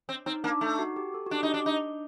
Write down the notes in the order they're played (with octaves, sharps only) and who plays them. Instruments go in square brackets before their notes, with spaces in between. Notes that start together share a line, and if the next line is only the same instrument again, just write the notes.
[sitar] C4
[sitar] C4 [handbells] D#4
[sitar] A#3 [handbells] D4
[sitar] A3 [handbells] D#4
[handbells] F#4
G4
A4
F#4
[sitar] D4 [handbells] G4
[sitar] D#4
D4
D#4